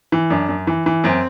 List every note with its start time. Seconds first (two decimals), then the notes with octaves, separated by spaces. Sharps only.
0.12 E3
0.30 F#2 D4
0.49 F#2
0.67 E3
0.86 E3
1.04 F#2 C4